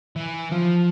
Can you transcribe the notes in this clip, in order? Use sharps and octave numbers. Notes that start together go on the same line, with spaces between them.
E3
F3